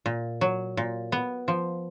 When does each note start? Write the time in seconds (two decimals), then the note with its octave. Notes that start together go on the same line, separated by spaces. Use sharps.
0.06 A#2
0.41 F#3
0.77 A#2
1.12 B3
1.48 F3